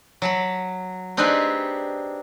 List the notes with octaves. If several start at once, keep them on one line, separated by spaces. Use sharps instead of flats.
F#3 A5 B5
C4 D4 D#4 G4 G#4 B4